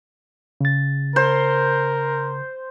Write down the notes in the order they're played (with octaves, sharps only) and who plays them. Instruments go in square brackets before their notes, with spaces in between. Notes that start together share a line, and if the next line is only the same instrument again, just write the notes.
[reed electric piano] C#3 A6
[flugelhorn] A#4 [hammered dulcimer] C5